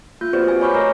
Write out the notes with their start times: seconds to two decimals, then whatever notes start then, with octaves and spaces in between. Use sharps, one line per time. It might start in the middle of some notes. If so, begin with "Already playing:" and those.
0.21 A#3 F4 G6
0.33 C4 F#4 G4 B4 C5 D5
0.48 G#5
0.61 C#5 B5 C#6 D6 F6 G6
0.73 A3 C4 A#4 G#5 A#5 A#6